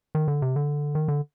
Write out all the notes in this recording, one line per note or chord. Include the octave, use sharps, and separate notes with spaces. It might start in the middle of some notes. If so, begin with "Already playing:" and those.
D#3
D3
C3
D3
D#3
D3